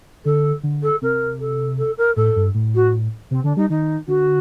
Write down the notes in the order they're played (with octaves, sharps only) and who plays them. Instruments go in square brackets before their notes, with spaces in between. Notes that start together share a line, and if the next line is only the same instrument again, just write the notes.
[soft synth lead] D3 [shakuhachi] A4
[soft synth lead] D3
[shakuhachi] A4
[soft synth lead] C3 [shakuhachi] A#4
[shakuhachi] A4
A4
A#4
[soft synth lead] A2 [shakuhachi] A4
[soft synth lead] G2
A2
[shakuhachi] F#4
[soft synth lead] C3 [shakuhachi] C4
[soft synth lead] D3 [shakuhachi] D4
[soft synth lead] G3 [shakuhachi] D#4
[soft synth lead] D#3 [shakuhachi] D#4
[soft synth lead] D3 [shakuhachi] F#4